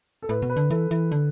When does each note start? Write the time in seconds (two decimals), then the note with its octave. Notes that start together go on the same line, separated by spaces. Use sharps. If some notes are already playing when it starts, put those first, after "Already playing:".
0.22 A4
0.29 A2 B4
0.42 B2
0.50 B4
0.57 D3
0.70 E3 A4
0.91 E3
1.12 D3